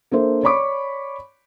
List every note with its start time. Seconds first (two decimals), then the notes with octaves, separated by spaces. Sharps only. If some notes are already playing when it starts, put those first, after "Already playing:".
0.11 A#3 D4 A4 C5 E5
0.43 C#5 D5 B5 C#6 D6